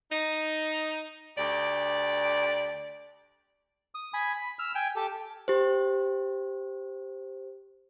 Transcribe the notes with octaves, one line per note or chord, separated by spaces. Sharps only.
D#4
D2 G4 D5
D#6
G#5 B5
B5
E6 F6
G5 G#5
G4 A4
G4 C5